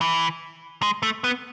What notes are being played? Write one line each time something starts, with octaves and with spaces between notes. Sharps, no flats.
E3
G#3
A3
B3